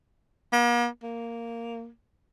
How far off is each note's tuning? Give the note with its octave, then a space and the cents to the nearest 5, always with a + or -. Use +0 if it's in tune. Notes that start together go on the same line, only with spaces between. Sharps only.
A#3 +45
A#3 -5